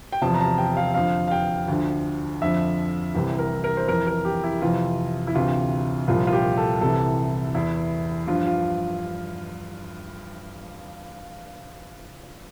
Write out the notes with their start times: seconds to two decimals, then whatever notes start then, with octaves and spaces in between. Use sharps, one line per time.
0.12 G5
0.22 E2 C3 F3 A5
0.34 A#5
0.40 A5
0.58 G5
0.77 F5
0.94 F2 D3 F3 F5
1.28 F5
1.31 G5
1.68 D2 D3 F3
2.42 F2 D3 F3 E5
3.15 C2 C3 E3
3.39 A#4
3.64 A#4
3.77 C5
3.88 F2 E3 A#4
4.07 A#4
4.25 G4
4.44 E4
4.62 F2 C3 E3 F4
5.27 E4
5.35 D2 C3 E3 F4
6.08 C2 A#2 F3 F4
6.27 F4
6.33 G4
6.57 A4
6.81 C2 C3 E3 A4
7.54 E2 E3 E4
8.27 G2 F3 F4
8.47 F4